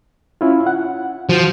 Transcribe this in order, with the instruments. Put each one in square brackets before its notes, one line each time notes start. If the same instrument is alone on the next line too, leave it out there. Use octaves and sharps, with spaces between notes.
[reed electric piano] C#4 E4 F4
F#5
[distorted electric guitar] F3 [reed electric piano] F#4